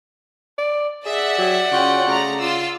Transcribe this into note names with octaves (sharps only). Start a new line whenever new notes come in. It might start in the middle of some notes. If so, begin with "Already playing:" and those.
D5
G#4 D5 E5 F#5
F#3 G4
C#3 C#4 F4 F#4 G5
C#3 A3 A#5
F4 D6 E6